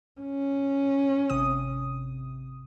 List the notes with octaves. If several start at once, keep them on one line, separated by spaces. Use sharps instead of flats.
C#4
G#1 C3 D#6